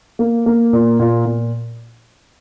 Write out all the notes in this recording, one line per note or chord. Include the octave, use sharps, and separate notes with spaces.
A#3
A#3
A#2
A#2
A#2